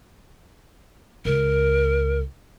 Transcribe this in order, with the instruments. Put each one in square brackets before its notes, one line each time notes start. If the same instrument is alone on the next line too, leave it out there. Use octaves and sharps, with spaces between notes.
[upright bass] C#2 [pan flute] A#4